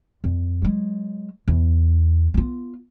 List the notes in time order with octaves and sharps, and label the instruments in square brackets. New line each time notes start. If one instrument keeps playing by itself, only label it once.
[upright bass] F2
F#3 G#3
E2
B3 F4